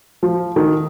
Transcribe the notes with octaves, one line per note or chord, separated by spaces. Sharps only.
F3
D#3